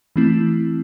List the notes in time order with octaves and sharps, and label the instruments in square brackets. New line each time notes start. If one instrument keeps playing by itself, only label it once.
[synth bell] E3 A3 C4 E4